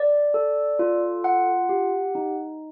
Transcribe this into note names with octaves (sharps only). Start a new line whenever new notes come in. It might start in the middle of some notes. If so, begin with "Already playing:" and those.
Already playing: D5
A4
F4
F#5
G4
D#4